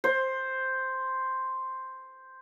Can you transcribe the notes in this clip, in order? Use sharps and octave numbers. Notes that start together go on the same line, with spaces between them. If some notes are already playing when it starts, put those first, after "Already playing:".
C5